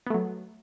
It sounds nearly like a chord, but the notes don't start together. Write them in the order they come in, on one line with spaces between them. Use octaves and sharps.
B3 A3 F#3